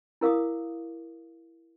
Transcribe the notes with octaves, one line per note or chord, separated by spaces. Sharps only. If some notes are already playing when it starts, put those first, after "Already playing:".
E4 A#4 F5 D6 D#6